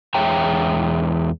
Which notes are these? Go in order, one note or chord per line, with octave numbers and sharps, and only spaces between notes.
E2 G#3 C#5 E5 G5 A#5